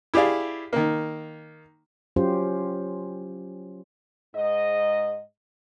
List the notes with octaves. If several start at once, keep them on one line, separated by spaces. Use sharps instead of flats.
E4 G4 G#4 D5 F5
D#3 A#3
F#3 C#4 F4 G4 C5
G#2 D#5